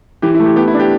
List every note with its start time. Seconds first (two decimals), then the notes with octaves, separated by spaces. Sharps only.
0.22 E3 G4
0.34 E4
0.40 A3
0.46 G4
0.56 B3 G4
0.67 E4
0.74 D4
0.80 G4